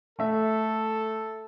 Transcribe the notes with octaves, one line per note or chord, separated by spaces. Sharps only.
A3 A4 E5